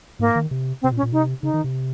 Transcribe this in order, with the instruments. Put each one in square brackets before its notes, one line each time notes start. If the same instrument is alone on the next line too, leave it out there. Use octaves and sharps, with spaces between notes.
[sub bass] G#2 [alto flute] A#3
[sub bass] D#3
C3
[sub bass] C3 [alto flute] C4
[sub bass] A#2
[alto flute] C#4
[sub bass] A#2
[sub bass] C3 [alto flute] D#4
[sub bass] C#3 [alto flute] D#4
[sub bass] D#3
C3